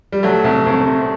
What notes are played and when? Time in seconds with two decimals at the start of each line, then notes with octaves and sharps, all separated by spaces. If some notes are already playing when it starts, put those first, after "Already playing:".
0.12 G3
0.23 F#3 A3
0.44 C2
0.66 C2
0.86 C3